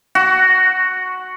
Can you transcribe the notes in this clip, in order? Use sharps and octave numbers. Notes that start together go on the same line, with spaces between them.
F#4